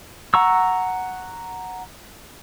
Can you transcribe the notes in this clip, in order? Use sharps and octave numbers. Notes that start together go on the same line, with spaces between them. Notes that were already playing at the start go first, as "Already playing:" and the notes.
F#5 A#5 C#6 E6